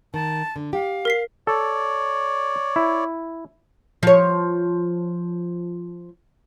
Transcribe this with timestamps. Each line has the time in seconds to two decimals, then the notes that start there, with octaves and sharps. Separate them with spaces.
0.14 D#3 A5
0.56 D3
0.73 G4 F5
1.05 A#4 B6 C7
1.47 A4 C#5 D5
2.76 E4
4.03 F3 C#5